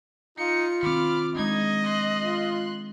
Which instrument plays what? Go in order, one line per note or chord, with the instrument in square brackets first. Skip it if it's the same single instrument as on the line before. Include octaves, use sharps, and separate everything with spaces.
[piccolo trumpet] D#4 [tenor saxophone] F4 [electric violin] C#7
[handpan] D#3 C4 [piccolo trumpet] B5 [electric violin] D6 F6
[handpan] G#3 D4 [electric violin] D#4 G#6 [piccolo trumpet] D#5
[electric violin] C6 F#6
[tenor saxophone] F4